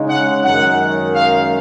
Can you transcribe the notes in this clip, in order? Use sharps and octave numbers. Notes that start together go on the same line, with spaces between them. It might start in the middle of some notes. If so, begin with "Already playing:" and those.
Already playing: C#3 G#3 D#4
F#5
F#2 D#3 G#3 F#5
F5